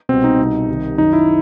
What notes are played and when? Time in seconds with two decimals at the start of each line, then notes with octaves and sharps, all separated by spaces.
0.09 C2 B2 C4
0.24 D#4
0.39 C2 B2
0.68 C2 C3 D#3
0.98 F#2 D#3 D#4
1.13 E4